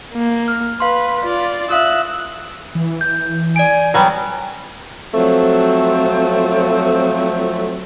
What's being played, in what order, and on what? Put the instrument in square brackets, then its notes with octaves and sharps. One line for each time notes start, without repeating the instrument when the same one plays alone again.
[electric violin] A#3
[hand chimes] F6
[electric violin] B4 [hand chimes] F5 C6
[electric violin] F4 D5
[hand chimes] E5 F5 D#6 [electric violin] E6 F#6
[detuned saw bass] E3
[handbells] G6
[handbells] D5 D7 [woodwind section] G#5
[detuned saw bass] D#3 [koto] F#3 G3 B3
[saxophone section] F3 F#3 A3 C4